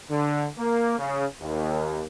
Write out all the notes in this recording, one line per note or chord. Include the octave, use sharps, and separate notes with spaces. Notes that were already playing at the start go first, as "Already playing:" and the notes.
D3
A#3
C#3
D#2